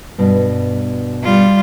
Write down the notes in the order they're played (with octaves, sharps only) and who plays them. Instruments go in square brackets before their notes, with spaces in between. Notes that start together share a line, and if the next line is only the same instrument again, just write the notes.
[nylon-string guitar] G2 B2
[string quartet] G3 F4